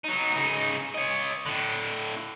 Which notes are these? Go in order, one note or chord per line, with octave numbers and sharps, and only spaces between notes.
F#3 D#4
C#3 D#4
C#5 D#5
A2 D3